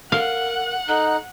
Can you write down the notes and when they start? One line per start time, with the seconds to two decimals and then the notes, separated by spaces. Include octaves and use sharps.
0.12 A#4 F5 F#5
0.88 D#4 A4 F#6